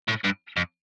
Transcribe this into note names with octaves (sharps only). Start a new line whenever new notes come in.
A2
G2
F2